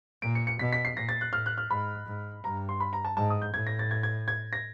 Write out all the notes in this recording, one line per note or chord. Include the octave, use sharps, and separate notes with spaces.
A#2 D7
C#7
C#7
B2 B6
B6
C7
A#2 A#6
A6
F#6
A2 F6
F#6
F6
G#2 B5
G#2
G2 A#5
C6
B5
A#5
A5
G#2 A5
D#6
G6
A2 G#6
A#6
A6
G#6
G#6
G#6
A#6